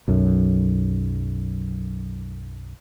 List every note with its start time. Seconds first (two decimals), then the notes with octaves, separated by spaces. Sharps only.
0.08 B1 F#2